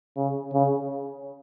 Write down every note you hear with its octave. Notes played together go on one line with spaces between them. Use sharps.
C#3
C#3